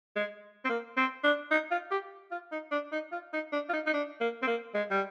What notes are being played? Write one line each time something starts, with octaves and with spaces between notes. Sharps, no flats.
G#3
C4
A#3
C4
D4
D#4
F4
G4
F4
D#4
D4
D#4
F4
D#4
D4
F4
D#4
D#4
D4
A#3
C4
A#3
G#3
G3